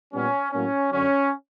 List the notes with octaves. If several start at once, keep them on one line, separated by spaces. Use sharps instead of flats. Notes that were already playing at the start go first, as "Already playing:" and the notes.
A#2 G3 B3 C#4
A2 F#3 A#3 C#4
F#2 D3 F#3 C#4